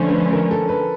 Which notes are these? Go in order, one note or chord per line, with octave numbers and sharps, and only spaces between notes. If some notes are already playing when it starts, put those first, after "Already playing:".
Already playing: D3 F3 A3 C#4 C5
B4
A#4
A4
B4